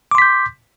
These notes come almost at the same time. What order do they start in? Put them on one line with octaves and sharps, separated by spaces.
D6 C6 B6 G6